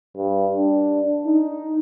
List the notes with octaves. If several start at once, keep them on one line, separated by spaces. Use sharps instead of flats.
G2
D4
D#4